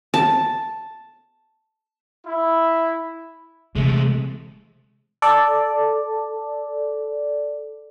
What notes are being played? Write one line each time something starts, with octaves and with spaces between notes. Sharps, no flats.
A5
E4
C3 E3 G#3 A3
A4 D5